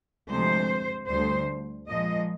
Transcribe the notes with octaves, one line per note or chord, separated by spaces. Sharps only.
D2 C3 F3 G#3 C5
D2 D3 G3 C5
A#2 F3 G#3 D#5